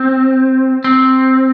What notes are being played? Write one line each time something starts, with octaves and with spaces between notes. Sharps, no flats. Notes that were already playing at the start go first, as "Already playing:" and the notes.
Already playing: C4
C4